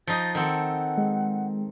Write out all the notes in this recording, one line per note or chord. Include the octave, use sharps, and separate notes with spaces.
F3 D#4 D#5 A6
D#3 C4 A4 F#5
G#3